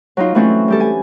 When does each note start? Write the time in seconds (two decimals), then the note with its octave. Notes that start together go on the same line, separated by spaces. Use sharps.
0.17 F#3 D#4 F4
0.35 E3 F#3 A3 C4 C#4 E4
0.68 G3 G4 A4
0.80 G#5